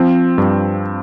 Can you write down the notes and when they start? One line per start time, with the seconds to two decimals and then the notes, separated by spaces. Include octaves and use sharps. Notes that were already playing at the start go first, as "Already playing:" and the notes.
Already playing: F3 C4
0.38 G2